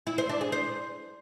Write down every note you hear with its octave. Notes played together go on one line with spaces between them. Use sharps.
E4
C5
D4
G#4
C5